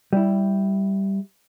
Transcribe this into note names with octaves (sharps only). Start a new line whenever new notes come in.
G3 E4